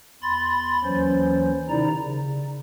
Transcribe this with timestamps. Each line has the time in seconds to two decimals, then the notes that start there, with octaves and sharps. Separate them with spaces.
0.22 E2 B5 C6 A6
0.84 D#2 E3 F#3 C#4 C5
1.69 C3 D#3 D#4 E4 D5 A#5
1.99 C#3